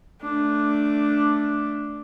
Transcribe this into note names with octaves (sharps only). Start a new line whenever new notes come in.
A3 D4